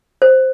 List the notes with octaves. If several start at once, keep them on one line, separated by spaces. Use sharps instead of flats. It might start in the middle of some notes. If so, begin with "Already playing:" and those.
C5